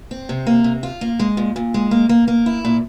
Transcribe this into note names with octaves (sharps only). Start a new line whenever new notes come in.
C4
C3
A#3
C3
F4
A#3
G#3
A#2
A#2
G#3
A#3
A#3
A#3
E4
A#2